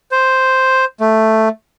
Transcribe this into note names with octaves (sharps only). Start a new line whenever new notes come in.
C5
A3